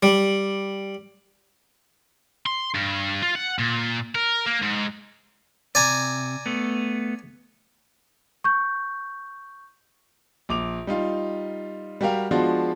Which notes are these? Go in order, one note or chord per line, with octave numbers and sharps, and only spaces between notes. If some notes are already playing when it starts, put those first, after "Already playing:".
G3
C6
G2
F4
F#5
A#2
A#4
A#3
G#2
C3 D5 G#5 A#5
A3 B3
C#6 G6
A#1 D6 F7
G3 D#4 F4
G3 F#4 G4 A#4 F5
F3 G#3 B3 D4 F4 F#4